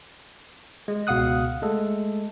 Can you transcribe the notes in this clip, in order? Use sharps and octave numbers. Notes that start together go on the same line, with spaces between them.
G#3
C#2 B2 F5 F#5 D#6 F#6
G#3 A3 A4